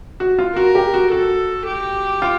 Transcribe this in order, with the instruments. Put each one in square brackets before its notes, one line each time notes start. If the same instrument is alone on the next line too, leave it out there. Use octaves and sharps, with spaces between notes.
[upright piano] F#4
F4
[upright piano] F#4 [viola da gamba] A#4
[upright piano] G4
F#4
[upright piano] F#4 [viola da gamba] A4
[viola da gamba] G4
[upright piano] F4